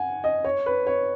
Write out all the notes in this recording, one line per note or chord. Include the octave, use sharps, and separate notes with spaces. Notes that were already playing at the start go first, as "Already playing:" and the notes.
Already playing: F#5 G#5
D#5
C#5
B4
C#5